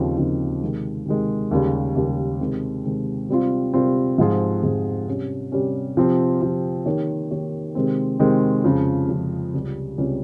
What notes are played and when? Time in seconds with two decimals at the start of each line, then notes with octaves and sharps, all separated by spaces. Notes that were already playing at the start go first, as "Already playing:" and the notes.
Already playing: D#2 C#3 F3 C4 D#4
0.17 D#2 C#3 F3 C4 D#4
0.61 C3 D#3 G#3
1.06 C3 D#3 G#3
1.51 D#2 C#3 G3
1.95 D#2 C#3 G3
2.40 C3 D#3 G#3 C4
2.85 C3 D#3 G#3 C4
3.29 C3 G3 C4 F4
3.74 C3 G3 C4 F4
4.18 G#2 F3 C4 F4 G#4
4.63 G#2 F3 C4 F4 G#4
5.07 C3 G3 C#4
5.52 C3 G3 C#4
5.97 C3 F3 C4
6.41 C3 F3 C4
6.86 D#3 A#3 D#4 G4 C#5
7.31 D#3 A#3 D#4 G4 C#5
7.75 C3 D#3 G#3 C4
8.19 C3 D#3 G#3 C4
8.64 F2 C#3 F3
9.09 F2 C#3 F3
9.54 C#2 C3 G3 C#4 G4
9.98 C#2 C3 G3 C#4 G4